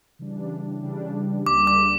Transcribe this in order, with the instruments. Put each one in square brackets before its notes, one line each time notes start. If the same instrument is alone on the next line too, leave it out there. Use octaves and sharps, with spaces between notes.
[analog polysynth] C#3 E3 G3 D4
C#3 E3 G3 D4
[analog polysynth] C#2 C#3 G3 A#3 D4 [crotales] D6
[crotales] D6